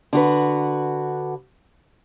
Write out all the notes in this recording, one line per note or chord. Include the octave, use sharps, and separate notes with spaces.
D3 F#4 B4